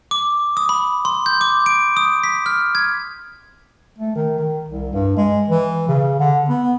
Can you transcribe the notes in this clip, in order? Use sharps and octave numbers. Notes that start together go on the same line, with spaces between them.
D6
D#6
B5
C6
G6
D6
D7
D#6
B6
F6
G#6
A3
D#3
D#3
C2
G2
G#3
E3
C#3
D3
B3